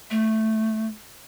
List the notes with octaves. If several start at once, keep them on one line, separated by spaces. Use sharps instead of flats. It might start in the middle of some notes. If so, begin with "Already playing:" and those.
A3